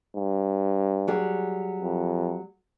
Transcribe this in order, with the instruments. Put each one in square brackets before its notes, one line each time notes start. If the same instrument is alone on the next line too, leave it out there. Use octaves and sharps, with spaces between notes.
[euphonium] G2
[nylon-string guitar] F#3 G3 G#4
[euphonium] F2